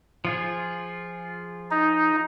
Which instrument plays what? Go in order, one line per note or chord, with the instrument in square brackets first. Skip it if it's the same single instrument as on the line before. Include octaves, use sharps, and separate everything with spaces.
[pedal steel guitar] F3 F4 G#4
[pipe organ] D#4